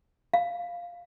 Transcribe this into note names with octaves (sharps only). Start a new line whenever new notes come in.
F5